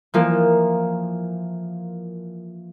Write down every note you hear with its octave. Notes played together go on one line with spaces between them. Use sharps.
E3 F3 A#3